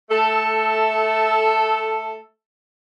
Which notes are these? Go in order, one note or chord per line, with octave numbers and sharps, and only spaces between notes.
A3 A4